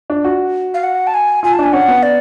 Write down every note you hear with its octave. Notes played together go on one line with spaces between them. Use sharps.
D4
F#4
F5
F#5
A5
G#5
F4 G#5
A5
D4 G#5
C#4 F#5
B3
D5